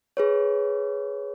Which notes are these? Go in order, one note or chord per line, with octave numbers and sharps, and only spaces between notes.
G#4 B4 C#5